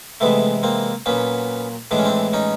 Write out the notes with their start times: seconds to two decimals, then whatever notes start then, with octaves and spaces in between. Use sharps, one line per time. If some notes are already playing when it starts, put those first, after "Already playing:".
0.21 C3 E3 G#3 A3 B3
0.63 A#3 C4
1.06 A#2 F#3 B3 C#4
1.91 A2 E3 G#3 D4
1.99 C#4
2.05 C4 D4
2.33 C#4 D#4